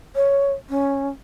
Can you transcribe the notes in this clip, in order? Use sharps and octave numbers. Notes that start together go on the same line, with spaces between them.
C#5
C#4